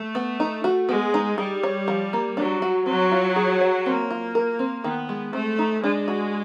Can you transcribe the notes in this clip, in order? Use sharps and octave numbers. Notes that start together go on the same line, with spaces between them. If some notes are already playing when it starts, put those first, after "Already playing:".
Already playing: A3
B3
D#4
F#4
G#3 B3
D#4
G3 G#4
C#5
F3
A#3
F#3 D4
F#4
F#3 C4
F4
G#4
C#5
A#3 C4
F4
A#4
C4
D#3 B3
G#3
A3 C4
D#4
G#3 D4
F#4